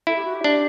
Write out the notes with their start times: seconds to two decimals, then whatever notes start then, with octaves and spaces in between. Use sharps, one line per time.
0.07 E4 A4
0.16 G4
0.25 F#4
0.34 G4
0.44 D4